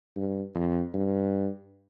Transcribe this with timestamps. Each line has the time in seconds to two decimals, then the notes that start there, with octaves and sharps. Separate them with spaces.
0.16 G2
0.55 F2
0.94 G2